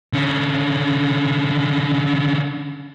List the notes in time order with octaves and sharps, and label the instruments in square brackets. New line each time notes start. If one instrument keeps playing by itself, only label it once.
[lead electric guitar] D3 C#4